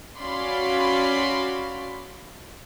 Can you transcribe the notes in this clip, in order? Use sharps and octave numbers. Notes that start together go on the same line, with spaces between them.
C#4 F#4 D5 F5 B5 C6